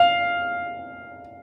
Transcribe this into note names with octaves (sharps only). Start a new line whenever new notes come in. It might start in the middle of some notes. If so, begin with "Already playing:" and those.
Already playing: F5